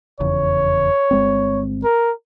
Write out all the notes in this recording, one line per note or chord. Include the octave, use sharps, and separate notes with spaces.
F1 E2 C#3 C#5
G1 G#3 C4
A#4